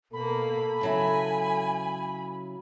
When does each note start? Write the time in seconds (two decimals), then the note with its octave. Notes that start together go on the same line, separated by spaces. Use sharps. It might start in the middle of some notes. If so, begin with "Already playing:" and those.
0.13 B2 A#3 A4 B5
0.81 C#3 F#3 E4 G#5